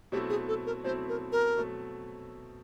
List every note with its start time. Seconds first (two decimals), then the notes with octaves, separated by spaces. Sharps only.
0.12 B2 F#3 A3 C4 E4 G4
0.29 G#4
0.48 A4
0.66 A#4
0.84 B2 F#3 A3 C4 E4 C5
1.09 A#4
1.32 A#4
1.57 B2 F#3 A3